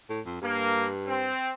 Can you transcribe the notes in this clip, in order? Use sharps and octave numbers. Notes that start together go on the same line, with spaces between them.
A2
F2
G2 A#3
C4